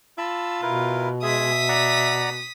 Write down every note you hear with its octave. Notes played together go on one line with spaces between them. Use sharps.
F4 A5 B5 E6
B2 E4 A#4 B4
G#3 G#4 E5 D#6 B6
D5 F#5 A#5